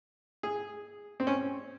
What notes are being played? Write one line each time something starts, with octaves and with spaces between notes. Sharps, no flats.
G#4
C4
C#4